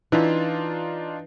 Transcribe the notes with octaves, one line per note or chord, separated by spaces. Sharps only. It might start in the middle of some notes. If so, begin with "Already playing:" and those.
E3 D4 D#4 F4 E5